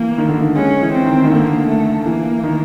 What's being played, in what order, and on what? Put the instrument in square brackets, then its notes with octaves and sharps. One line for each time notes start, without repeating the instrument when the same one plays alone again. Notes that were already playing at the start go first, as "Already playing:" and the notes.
Already playing: [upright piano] E3 [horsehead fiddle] A#3
[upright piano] D#3
D3
D#3
[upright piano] G#3 [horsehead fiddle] C#4
[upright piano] E3
[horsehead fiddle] C4
[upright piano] D#3
D#3
[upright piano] D3 [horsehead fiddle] A#3
[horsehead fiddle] A3
[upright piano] E3 [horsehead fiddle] A#3
[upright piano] D#3